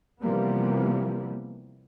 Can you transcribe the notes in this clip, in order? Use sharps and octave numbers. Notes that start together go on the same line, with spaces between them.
C3 E3 F3 G3 A#3 B3